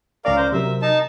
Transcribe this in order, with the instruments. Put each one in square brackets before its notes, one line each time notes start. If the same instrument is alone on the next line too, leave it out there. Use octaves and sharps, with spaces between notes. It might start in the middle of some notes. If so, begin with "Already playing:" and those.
[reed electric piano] C#2 C#4 D5 [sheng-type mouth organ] A#4 F5
[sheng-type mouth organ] C5
[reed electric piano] C3 F#3 A#4 [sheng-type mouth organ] E5
[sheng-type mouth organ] D#4 A5